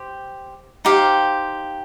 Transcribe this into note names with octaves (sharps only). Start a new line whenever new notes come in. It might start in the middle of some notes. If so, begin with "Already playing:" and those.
Already playing: G4 C5
D#4 G4 C5 F5